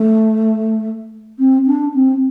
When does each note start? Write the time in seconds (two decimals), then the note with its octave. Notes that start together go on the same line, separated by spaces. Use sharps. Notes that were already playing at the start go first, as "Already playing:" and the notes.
Already playing: A3
1.39 C4
1.66 D4
1.94 C4